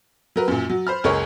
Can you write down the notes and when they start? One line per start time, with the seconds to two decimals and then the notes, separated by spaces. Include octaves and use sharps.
0.36 F#3 A#4 B4
0.48 F#2 A#2
0.70 F#3
0.87 C5 B5 F6
1.04 F#1 C#2 G#4 A#4 C#5